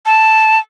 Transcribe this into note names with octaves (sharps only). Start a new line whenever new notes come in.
A5